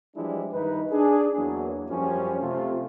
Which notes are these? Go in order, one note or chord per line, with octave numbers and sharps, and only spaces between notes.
E3 F3 G3 G#3 D4 E4
G2 D#3 D#4 B4
D4 G#4
E2 F#3 A#3
F#2 F3 G3 C#4
C3 A3 F4